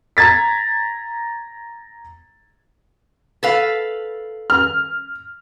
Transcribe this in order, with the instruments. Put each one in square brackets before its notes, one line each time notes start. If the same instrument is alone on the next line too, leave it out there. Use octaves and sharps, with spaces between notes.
[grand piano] A#5 G#6 A6 B6
[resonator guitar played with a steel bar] A4 B4 F5
[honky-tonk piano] F6